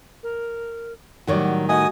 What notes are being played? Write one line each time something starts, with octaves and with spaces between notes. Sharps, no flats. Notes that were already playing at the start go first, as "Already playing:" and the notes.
A#4
A2 D#3 F#3 G3 F#4 C#5 D5
A3 F#4 D#5 F#5 G#5 D#6